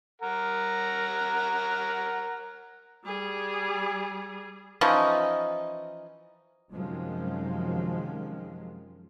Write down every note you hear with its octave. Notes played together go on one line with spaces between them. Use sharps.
A#4 F#5 A#5
G3 G#4
E3 F3 C#4 D#4
F#2 C3 D#3 F3 F#3 G#3